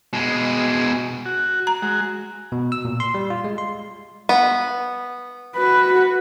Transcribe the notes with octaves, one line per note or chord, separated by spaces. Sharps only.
B2 G#3
F#4
A#5
G#3 F#4
B2
E6
A#2
C6
G3
F4
G#3
C6
B3
F#4 B4